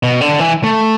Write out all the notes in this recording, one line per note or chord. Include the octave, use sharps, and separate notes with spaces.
B2
D3
E3
A3